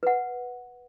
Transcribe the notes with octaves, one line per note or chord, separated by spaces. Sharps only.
B4 F#5